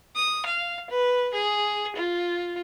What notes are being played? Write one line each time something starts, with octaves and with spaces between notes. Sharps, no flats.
D#6
F5
B4
G#4
F4